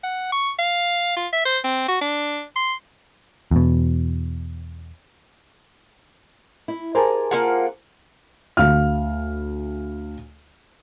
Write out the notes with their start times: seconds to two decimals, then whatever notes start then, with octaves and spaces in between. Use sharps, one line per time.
0.03 F#5
0.32 C#6
0.59 F5
1.16 F4
1.33 E5
1.45 C5
1.64 C4
1.88 F#4
2.01 D4
2.56 C6
3.51 E2 B2
6.68 E4
6.95 G4 G#4 A#4 C5 G#5 A5
7.31 A#3 F4 F#5
8.57 D2 F5 F6